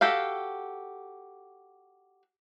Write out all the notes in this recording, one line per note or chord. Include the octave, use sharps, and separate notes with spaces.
F#4 G4 A4 F5